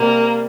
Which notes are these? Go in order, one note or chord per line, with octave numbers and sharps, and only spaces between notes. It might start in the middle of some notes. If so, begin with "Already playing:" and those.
Already playing: C3 G3 A#3